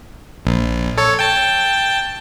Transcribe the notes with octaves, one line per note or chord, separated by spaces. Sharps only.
A#1
A4 C#5
G5 A5